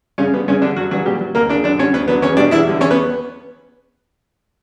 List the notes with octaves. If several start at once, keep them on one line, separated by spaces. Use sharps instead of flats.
G2 C#3 C#4
D3 G3 B3
G2 C#3 C#4
D3 G3 D4
F#2 F#3 F#4
C#3 E3 F#3 G3 F#4
A#2 G3 G4
F#3
D2 A#3 A#4
C#3 F#3 D4 D5
F#2 D4 D5
D3 G3 C#4 C#5
D2 B3 B4
D3 F#3 B3 B4
E2 C#4 C#5
B2 G3 D4 D5
E2 E4 E5
D3 G3
E2 C#4 C#5
B3 B4